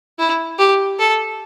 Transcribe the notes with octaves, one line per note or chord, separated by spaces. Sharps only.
E4
G4
A4